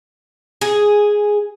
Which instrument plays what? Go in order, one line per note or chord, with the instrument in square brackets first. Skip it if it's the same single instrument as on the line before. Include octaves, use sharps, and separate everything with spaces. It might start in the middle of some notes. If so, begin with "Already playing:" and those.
[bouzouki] G#4